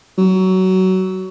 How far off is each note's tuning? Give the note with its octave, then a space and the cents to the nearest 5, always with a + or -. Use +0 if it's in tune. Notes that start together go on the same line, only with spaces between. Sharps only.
F#3 +20